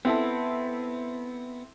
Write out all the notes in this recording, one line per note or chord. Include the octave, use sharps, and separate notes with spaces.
B3 C4 E4 A4